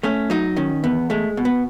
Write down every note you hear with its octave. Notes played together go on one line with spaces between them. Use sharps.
A3 C#4
F#3 D#4
D#3 C#4
E2 B3
G#3 A3
B2
B3